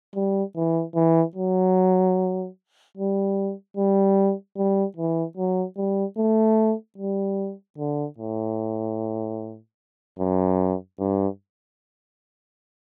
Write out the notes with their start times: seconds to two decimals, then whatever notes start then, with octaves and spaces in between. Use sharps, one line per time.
0.15 G3
0.56 E3
0.95 E3
1.36 F#3
2.97 G3
3.77 G3
4.57 G3
4.97 E3
5.37 F#3
5.77 G3
6.18 A3
6.98 G3
7.78 D3
8.18 A2
10.19 F#2
10.99 G2